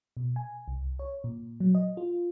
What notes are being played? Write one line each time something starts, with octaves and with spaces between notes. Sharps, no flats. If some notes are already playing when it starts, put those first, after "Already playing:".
B2
G#5
C2
C#5
A#2
F#3
D#5
F4